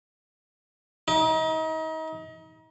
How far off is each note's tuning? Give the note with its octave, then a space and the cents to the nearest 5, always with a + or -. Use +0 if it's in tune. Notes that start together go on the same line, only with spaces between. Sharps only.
D#4 +35